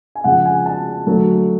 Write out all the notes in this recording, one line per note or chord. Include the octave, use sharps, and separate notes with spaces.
G#5
C#3 F3 G#3 F#5
G#5
A5
D3 F#3 A3